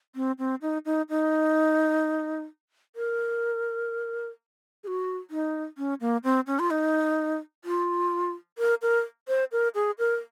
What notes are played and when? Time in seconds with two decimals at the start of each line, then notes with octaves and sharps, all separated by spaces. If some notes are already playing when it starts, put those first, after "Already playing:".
0.16 C4
0.39 C4
0.62 D#4
0.85 D#4
1.09 D#4
2.96 A#4
4.84 G#4
4.87 F#4
5.31 D#4
5.78 C#4
6.01 A#3
6.24 C4
6.47 C#4
6.59 F4
6.71 D#4
7.65 F4
8.58 A#4
8.82 A#4
9.28 C5
9.52 A#4
9.75 G#4
9.99 A#4